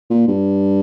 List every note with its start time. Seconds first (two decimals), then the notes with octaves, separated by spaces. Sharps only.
0.10 A#2
0.28 G2